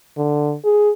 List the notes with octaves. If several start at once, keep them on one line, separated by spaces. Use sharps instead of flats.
D3
G#4